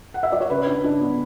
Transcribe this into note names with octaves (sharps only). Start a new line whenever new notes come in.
F#5
E5
D5
C#5
C#3 B4
D4
D4
B3